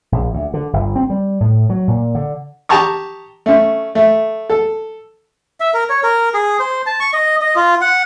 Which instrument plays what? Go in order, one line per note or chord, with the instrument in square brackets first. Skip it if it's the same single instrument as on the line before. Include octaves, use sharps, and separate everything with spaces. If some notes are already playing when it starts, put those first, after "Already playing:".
[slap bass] A#1
D2
D3
G1
C4
G3
A2
F#3
A#2
D3
[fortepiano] G4 A5 A#5 C#6 D#6
A3 C#4
A3
A4
[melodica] E5
A#4
C#5
A#4
G#4
C5
A5
C#6
D#5
D#5
F4
F#5